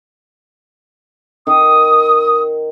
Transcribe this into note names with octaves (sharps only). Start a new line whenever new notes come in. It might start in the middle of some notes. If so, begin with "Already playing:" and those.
D#3 D#6